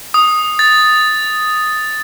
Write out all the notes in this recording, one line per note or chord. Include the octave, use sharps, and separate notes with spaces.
D#6
A6